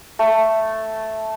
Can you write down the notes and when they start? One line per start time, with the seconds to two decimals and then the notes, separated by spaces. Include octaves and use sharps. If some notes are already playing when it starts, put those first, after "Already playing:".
0.19 A3